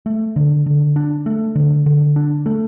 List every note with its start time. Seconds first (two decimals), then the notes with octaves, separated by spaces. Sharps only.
0.06 A3
0.36 D3
0.66 D3
0.96 D4
1.26 A3
1.55 D3
1.86 D3
2.16 D4
2.46 A3